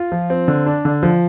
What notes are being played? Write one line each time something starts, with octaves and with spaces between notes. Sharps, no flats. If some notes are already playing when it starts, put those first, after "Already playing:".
Already playing: F4
F3
C4
D3
D4
D3
F3